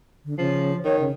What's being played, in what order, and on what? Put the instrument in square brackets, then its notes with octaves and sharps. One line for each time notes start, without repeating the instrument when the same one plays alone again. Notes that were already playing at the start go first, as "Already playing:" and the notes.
[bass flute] D3
[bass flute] C#3 [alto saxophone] F3
[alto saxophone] D#3 [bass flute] C#5
[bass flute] C#3